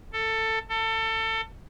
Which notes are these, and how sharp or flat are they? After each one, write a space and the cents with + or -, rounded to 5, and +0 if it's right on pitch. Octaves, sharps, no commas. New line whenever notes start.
A4 +15
A4 +25